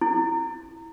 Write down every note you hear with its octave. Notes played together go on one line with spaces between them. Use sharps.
E4